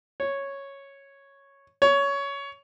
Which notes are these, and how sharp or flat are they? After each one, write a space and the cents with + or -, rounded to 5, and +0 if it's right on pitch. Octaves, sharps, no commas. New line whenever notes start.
C#5 -5
C#5 +15